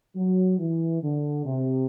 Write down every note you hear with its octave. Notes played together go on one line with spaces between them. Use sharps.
F#3
E3
D3
C3